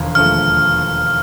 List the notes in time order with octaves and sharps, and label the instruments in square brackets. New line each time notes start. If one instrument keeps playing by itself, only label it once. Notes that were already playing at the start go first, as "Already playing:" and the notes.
Already playing: [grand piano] E1 D#2 D3 F3
[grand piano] E1 D#2 D3 F3 A3 [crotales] F6